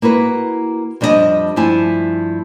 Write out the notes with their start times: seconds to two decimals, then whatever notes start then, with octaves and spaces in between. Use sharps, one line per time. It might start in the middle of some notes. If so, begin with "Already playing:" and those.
0.02 A#3 E4 F#4 B4
1.01 F2 G3 D4 D#4 D#5 A5
1.56 G2 F3 A3 E4 G#5 A5